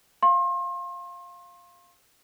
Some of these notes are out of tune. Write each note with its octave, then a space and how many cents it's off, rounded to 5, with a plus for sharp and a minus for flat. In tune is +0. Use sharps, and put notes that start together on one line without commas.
F5 +0 C6 +35